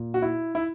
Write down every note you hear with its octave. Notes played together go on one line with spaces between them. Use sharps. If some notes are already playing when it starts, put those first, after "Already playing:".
Already playing: A#2
F#4
E4
E4